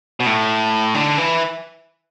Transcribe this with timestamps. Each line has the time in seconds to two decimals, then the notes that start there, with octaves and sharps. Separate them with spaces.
0.20 B2
0.26 A2
0.94 D3
1.17 E3